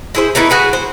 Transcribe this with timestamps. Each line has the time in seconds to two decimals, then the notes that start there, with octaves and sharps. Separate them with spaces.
0.15 E4 G#4 C5
0.35 A3 B3 D#4 E4
0.50 F#4 G#4 B4
0.73 C5